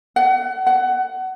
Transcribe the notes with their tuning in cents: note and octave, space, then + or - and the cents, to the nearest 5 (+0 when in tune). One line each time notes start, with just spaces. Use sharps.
F#5 +30
F#5 +25